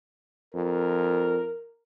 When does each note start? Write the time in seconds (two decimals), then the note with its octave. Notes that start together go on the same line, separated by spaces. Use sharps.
0.54 F2 A#4